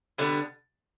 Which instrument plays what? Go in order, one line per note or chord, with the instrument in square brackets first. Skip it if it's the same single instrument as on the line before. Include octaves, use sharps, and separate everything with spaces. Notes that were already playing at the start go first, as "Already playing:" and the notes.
[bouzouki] D3 G3 B3 D4